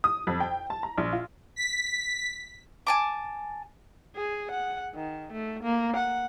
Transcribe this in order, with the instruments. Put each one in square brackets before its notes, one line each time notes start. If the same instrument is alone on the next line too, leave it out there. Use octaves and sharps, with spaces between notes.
[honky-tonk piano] D#6
F2
G5
A5
A#5
A#1
F4
[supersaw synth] B6
[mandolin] G#5 A5 D6
[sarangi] G#4
F#5
D#3
A3
A#3
F#5